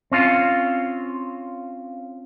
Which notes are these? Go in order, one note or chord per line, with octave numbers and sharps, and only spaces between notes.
C4 C#4 F4